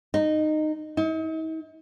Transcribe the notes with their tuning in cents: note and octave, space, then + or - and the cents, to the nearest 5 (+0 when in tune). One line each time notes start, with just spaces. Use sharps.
D#4 -15
D#4 +45